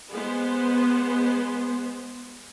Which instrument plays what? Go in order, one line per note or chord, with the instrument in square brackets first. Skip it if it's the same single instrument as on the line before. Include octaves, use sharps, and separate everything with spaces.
[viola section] G#3 B3 C5